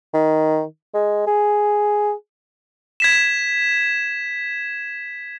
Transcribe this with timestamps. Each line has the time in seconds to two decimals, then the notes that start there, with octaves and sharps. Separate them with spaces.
0.14 D#3
0.94 G#3
1.27 G#4
3.00 G#6 B6 E7